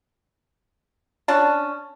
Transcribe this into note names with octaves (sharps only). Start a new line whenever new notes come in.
C#4 D4 A5